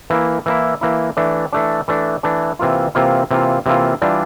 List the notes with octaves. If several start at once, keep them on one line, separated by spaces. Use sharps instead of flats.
E3 A#3 E4
E3 A#3 E4
E3 A#3 E4
E3 A3 D4
E3 A3 D4
E3 A3 D4
E3 A3 D4
C3 E3 A#3 F4
C3 E3 A#3 F4
C3 E3 A#3 F4
C3 E3 A#3 F4
E3 G3 D4 F4